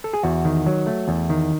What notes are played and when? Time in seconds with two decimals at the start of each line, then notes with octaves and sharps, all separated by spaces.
0.04 A4
0.14 G#4
0.23 E2 F#4
0.45 D#3
0.66 F#3
0.87 A3
1.08 E2
1.30 D#3